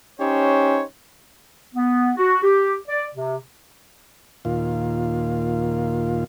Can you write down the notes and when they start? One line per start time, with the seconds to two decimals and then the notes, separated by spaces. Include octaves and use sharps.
0.20 C#4 D#4 G4 C5 C#5
1.75 B3
2.16 F#4
2.43 G4
2.88 D5
3.14 C3
4.45 D#2 A#2 F4